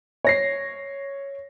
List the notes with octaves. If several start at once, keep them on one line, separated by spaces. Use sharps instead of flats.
C#5 A#6 C7